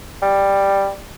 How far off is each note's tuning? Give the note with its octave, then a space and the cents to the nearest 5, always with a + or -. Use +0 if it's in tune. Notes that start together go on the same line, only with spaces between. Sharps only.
G3 +10